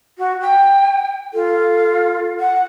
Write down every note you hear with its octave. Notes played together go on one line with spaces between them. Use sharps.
F#4
G5
F4 A4
F#5